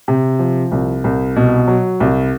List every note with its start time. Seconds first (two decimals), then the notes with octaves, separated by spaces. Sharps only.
0.08 C3
0.39 F3
0.72 C2
1.04 C2
1.36 B2
1.68 F#3
2.00 C2